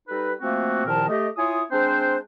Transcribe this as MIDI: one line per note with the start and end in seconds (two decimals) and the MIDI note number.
0.08 0.33 55
0.08 0.33 63
0.08 0.33 69
0.08 0.33 71
0.41 0.84 53
0.41 0.84 57
0.41 0.84 58
0.41 0.84 60
0.41 0.84 66
0.86 1.08 36
0.86 1.08 46
0.86 1.08 51
0.86 1.08 53
0.86 1.08 70
0.86 1.08 81
1.09 1.28 57
1.09 1.28 67
1.09 1.28 75
1.37 1.62 64
1.37 1.62 65
1.37 1.62 73
1.37 1.62 80
1.37 1.62 87
1.72 2.17 56
1.72 2.17 60
1.72 2.17 62
1.72 2.17 72